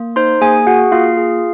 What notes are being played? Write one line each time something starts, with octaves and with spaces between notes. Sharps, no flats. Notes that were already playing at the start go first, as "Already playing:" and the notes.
Already playing: A#3
D#4 C5 C6
A#3 G#4 G#5
F#4 G#4 F#5
A#3 F4 F5
G#4